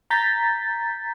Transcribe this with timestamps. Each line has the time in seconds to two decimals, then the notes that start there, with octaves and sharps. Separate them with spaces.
0.10 A#5 G6 A6 B6